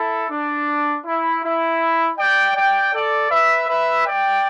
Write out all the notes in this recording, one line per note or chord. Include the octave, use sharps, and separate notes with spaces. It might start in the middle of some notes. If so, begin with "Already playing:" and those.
Already playing: E4 A4
D4
E4
E4
D5 G5
D5 G5
A4 D5
B4 E5
B4 E5
D5 G5